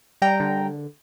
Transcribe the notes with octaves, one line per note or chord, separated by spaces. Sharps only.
G3 G5 A#5
D3